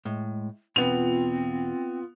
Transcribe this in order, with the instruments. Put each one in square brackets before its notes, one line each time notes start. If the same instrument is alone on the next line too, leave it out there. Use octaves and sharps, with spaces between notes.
[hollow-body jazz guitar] A2 [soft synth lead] G#3
[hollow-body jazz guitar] E2 B2 [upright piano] B3 F7 [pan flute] C4 [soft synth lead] F4